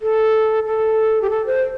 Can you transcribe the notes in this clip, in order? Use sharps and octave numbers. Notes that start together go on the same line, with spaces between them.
A4
A4
G4
A4
C5